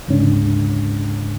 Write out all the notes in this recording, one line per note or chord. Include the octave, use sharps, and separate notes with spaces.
D2 G#2 C#3 G#3 C#4 D4